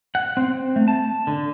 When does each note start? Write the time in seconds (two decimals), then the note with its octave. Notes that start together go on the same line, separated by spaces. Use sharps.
0.15 F#5
0.37 C4
0.76 A3
0.88 A5
1.27 D3